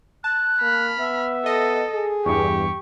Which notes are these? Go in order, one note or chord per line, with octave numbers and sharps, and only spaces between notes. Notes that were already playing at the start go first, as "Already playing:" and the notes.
A5 F#6
A#3 B5 F6
B3 E5
A4 D#5
G#4
E2 G2 G4 C#6